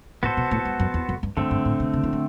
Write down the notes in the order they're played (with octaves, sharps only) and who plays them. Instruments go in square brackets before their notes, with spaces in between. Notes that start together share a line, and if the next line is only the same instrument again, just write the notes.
[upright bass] A2 [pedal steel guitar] B3 F#4 A4 C5
[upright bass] B2
A2
G2
F#2
E2
F#2
G2
[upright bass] G2 [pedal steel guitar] D3 A3 C4
[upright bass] G2
A2
B2
C3
E3
F#3